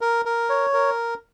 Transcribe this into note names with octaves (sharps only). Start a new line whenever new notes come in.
A#4
A#4
C#5
A#4